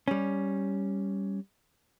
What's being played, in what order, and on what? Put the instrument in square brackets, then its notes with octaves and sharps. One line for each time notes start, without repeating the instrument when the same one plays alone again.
[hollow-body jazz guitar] G3 C#4